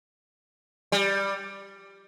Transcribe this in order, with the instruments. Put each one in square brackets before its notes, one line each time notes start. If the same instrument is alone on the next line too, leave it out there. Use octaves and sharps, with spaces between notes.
[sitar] G3